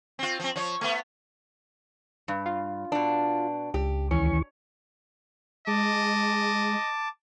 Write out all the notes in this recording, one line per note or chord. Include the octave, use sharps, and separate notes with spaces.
C4 F4
F3 C4
F3 C#5
A3 B3
G2
F4
B2 D4
C#2 G4
D#2 E3 C#4 C#6
G#3 D#5 A5 D6